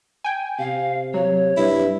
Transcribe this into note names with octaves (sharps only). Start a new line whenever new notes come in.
G5 G#5
C3 F5
F#3 C#5
G2 E4